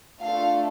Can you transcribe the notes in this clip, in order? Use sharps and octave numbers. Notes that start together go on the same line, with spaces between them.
A3 D4 F4 A4 F5